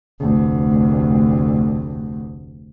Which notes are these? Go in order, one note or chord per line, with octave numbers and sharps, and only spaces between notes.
F1 D2